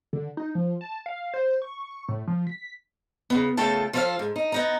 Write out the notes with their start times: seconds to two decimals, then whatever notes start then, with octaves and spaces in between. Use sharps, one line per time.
0.13 D3
0.37 D#4
0.55 F3
0.81 A5
1.06 F5
1.34 C5
1.62 C#6
2.09 A2
2.27 F3
2.47 B6
3.30 C#3 B3
3.57 C#3 A3 F4 A4 G5 A5
3.93 F3 F4 A4 B4 C5 F5
4.19 G#2
4.36 D#4
4.52 B3 D#4 A#5